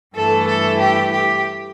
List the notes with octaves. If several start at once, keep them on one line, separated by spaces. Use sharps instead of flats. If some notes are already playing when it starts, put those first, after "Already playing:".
G2 E3 A3 A4
A4
G4
G4